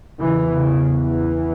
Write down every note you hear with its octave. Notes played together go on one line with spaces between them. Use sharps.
E2 C#3 E3
C#3
E3